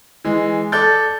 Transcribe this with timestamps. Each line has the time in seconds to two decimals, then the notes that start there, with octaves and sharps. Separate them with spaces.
0.24 E3 G#3
0.72 A4 D5 G6 A6